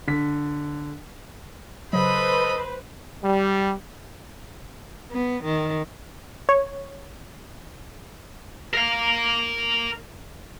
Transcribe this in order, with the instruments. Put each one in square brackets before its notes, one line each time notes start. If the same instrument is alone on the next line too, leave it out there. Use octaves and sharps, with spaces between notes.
[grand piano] D3 B6
[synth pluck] C#3 F#3 [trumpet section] A4 D#5 [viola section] B4 C5 [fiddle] B5
[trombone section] G3
[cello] B3
D#3
[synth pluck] C#5
[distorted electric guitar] A#4 F5